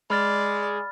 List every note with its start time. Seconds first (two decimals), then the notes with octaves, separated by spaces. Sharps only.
0.10 G#3 D5 B5 F6 A6